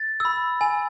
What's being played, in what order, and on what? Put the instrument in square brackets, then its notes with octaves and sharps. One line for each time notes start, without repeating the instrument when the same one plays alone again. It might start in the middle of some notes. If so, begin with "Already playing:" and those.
Already playing: [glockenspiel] A6
B5 E6
G#5